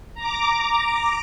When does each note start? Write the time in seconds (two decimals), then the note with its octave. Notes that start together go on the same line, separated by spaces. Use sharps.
0.14 A#5 D6